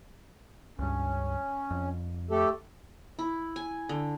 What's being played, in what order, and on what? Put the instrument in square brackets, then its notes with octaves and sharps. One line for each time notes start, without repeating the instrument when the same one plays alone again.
[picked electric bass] C#2 G2 [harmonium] C#4
[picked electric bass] F2
[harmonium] A3 G4 A4
[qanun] E4
G#5
D3